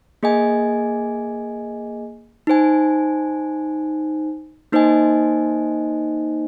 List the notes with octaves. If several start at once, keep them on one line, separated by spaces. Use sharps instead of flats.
A#3 G#4 D#5 G#5
D#4 C5 G#5
A#3 D#4 C5 D#5 G#5